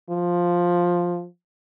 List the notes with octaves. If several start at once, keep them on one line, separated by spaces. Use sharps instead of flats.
F3